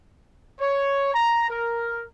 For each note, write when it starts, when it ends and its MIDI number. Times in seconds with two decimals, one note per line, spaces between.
0.60 1.13 73
1.14 1.48 82
1.50 2.05 70